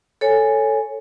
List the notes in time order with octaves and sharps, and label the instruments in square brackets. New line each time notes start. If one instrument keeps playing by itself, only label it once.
[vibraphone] A4 C#5 G#5